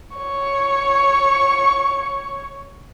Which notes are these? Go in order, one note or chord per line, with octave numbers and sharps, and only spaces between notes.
C#5 C#6